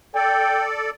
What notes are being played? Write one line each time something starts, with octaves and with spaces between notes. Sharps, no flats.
A4 D5 G5